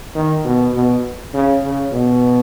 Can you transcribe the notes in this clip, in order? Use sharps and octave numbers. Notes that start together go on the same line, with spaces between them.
D#3
B2
B2
C#3
C#3
B2